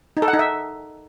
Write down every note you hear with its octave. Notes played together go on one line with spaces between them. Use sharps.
D#4
A4
F#5
D#4
E5